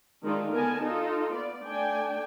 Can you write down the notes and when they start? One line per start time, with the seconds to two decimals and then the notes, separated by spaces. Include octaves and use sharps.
0.23 D#3 G#3 D4 D#4 F4
0.53 D3 B3 A#4 G#5 A5
0.82 D#4 F4 A4
1.34 B3 D5
1.65 A3 D4 G5 G#5